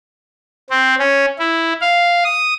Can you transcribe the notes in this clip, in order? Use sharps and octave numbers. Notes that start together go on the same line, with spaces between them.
C4
C#4
E4
F5
D#6